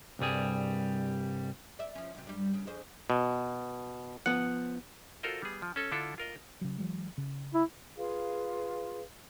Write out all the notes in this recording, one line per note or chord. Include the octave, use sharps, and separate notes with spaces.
C2 G2 G3 G#4
D5 E5
F3 C#4
F#2 C3
G2 G3
C#3
F2 G#4 C5
B2
F3 B3 F#5
F4 F#4 A4 A#4 C5 D#5
G3 B3 G#4
F3
C#4 A4
D3 D4 E4 F4 A4
F4 A#4 D#5
C#3 F#3
E3 F#3 G#3
C#3
E4
F4 G#4 B4 F5